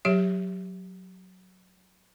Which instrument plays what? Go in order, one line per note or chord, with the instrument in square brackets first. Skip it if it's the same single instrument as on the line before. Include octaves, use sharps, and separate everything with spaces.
[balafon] F#3 G4 C#5 E5